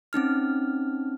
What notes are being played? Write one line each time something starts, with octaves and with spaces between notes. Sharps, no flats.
C4 C#4 D#4 F6